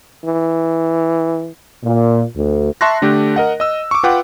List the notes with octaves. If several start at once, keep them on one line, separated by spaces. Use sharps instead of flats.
E3
A#2
D2
E5 A5 C6 C#6 F#6 A#6
D3 A3 D4 G4
A#4 D#5 F#5
D#5 E6
C#6 D6
F4 B4 F#5 G5 D6